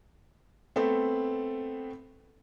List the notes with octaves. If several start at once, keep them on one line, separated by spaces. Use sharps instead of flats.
A3 B3 C4 A4